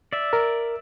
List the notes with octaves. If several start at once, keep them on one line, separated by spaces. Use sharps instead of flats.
D5 E5
A#4